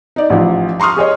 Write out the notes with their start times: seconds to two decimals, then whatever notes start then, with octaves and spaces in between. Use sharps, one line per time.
0.16 D#4 D5
0.30 A1 F3
0.80 A#5 C6 C#6 D#6 F6
0.96 G4 G#4 C#5 D#5